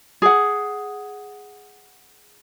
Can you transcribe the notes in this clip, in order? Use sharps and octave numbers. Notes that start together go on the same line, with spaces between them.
G#4 F#5